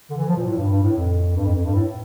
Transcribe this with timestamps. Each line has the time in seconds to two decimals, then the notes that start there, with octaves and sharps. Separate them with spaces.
0.10 D3
0.17 E3
0.27 F3
0.37 A#2
0.46 A2
0.57 G2
0.70 G2
0.83 A2
0.96 F2
1.36 G2
1.45 F2
1.55 F2
1.65 G2
1.75 A2